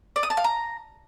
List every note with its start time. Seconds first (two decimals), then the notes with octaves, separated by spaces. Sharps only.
0.16 D5
0.23 D#6
0.30 A5
0.37 F5
0.44 A#5